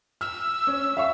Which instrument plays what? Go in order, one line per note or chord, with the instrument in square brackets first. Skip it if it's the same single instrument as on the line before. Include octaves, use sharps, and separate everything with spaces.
[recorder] E6 [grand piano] F6
[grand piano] C#4
E5 F5 C#6